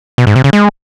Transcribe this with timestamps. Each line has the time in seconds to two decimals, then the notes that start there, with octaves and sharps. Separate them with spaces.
0.18 B2
0.27 G#2
0.36 C3
0.44 C#3
0.53 G#3